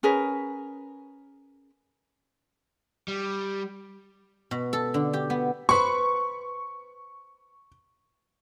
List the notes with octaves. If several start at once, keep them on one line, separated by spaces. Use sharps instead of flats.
C#4 G#4 A#4 B4
G3
B2
A4
D3
G4
B3
B4 C5 C#6